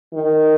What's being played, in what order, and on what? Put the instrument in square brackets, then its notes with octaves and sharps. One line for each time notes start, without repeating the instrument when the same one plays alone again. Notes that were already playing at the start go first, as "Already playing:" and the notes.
[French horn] D#3